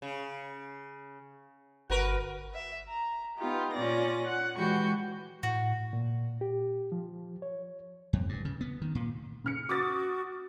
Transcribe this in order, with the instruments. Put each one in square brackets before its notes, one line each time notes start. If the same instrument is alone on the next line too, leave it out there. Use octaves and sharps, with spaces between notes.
[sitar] C#3
[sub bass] G1 [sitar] F#4 A#4 B4
[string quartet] E5
A#5
B3 D#4 F4 G4
A#2 C#4 F4 D5 A#6
F#5
E3 G#3 F#4 G4 C#6 G6
[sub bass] A2 [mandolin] F#4
[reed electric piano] A#2
G4
F3
C#5
[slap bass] F2
G2
C#3
B3
D#3
A#2
[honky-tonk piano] C#3 F6 C#7
[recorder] F#4 [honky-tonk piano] D6 D#6 A6